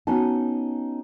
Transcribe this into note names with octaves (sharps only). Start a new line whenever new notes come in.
B3 C#4 D#4 F#4 G#5 A5